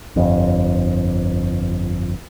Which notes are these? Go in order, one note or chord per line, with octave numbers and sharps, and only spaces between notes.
G1 F2